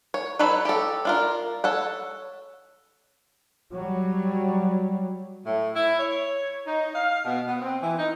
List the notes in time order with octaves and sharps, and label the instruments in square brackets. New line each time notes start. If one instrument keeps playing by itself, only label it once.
[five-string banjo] C#5
F#3 D#4 A4 B4 C#5
G4 A4
D4 F4 A#4
A4 C#5 F#5
[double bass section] F#3 G3
[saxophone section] A2
E4
C#5
D#4
F5
B2
B3
C4
E3
D#4